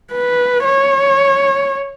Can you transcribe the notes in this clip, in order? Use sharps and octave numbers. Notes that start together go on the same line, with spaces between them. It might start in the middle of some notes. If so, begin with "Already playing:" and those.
B4
C#5